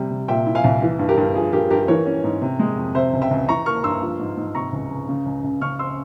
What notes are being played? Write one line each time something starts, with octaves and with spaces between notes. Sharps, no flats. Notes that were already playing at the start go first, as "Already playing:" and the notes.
Already playing: C3 G3
C3
A#2 E5 G5
E4
F5 G#5
C2
E3
G2
G4 A#4
G2
F3 G#4
G2 G4 A#4
G2 G4 A#4
E3 A#4 C#5
C#4
G#2
C3
G#3
F2
C3 C5 E5
C#2
E5 G5
C#2
E3 A#5 C#6
A#3 C#6 F6
G2 C6 E6
F3
G#2
G#2
C3 A#5 C#6
C#2
C#2
C#3
C#2
C#2
C#3 C#6 F6
C4 C6 E6